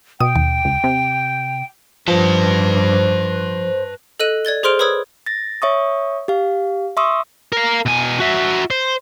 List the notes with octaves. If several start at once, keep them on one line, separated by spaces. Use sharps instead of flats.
B2 G5 D#6
D#2
C#2
C3
G2 F3 B4 C5 A5
A4 D#5 F#6 D#7
D5 G#6 A6 G7
G#4 C5 C6 F6 D7 F7
B4 C#5 B5 D#6 E6 G#6
A6 A#6
C#5 E5 C#6 D#6
G4 F5
E5 C6 C#6 D#6 E6
A#4 F5
B2 G#5
F#4 E5
C5